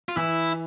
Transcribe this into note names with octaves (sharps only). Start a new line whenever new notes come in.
F4
E3 E4